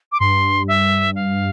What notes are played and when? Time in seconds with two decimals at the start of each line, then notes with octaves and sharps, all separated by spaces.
0.12 D6
0.20 G2 C6
0.68 E5
1.15 F5